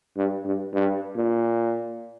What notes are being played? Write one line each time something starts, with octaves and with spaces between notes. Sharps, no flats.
G2
G2
G2
A#2